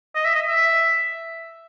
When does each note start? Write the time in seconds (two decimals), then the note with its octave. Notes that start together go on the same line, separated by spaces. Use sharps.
0.15 D#5
0.25 E5
0.35 D#5
0.48 E5